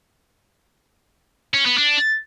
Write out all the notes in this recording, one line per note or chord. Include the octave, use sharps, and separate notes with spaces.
C#4
B3
D4